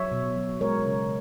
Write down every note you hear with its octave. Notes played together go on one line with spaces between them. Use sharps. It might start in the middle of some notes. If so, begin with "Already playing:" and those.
Already playing: F#3 C#5 E5
B2
F#3
G#3 A#4 C#5
C#3